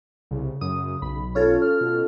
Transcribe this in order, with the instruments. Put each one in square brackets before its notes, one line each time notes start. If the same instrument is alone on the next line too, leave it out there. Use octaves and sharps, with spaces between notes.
[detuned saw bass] C2 [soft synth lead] C#3
[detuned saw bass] F#2 [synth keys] D#6
[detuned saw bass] B1 [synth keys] B5
[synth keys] C#4 F4 A4 [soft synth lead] C#5
[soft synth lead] F6
[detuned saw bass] B2